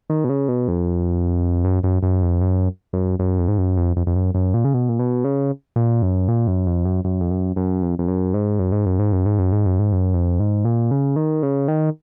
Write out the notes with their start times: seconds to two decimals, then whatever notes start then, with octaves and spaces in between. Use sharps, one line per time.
0.10 D#3
0.24 B2
0.29 C#3
0.48 B2
0.68 F2
1.65 F#2
1.84 F#2
2.03 F#2
2.22 F2
2.41 F#2
2.93 F#2
3.19 F#2
3.38 F2
3.48 G#2
3.58 F#2
3.77 F2
3.96 F2
4.07 F2
4.15 F#2
4.35 F#2
4.54 A#2
4.65 C#3
4.74 B2
4.89 A#2
4.99 B2
5.24 C#3
5.76 A#2
6.02 F#2
6.28 A#2
6.47 F#2
6.66 F2
6.85 F#2
7.05 F#2
7.21 F2
7.31 F#2
7.56 F#2
7.82 F2
7.99 F2
8.08 F#2
8.34 G#2
8.59 F#2
8.72 G#2
8.86 F#2
8.99 G#2
9.12 F#2
9.26 G#2
9.39 F#2
9.52 G#2
9.66 F#2
9.79 G#2
9.92 F#2
10.14 F2
10.40 G#2
10.65 A#2
10.91 C#3
11.16 D#3
11.43 C#3
11.68 D#3